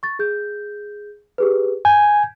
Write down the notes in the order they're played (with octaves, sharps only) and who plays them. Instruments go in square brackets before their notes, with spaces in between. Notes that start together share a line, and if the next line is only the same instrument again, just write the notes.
[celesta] C#6 A6
G#4 G6
G4 G#4 B4
[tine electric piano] G#5 [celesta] G6 G#6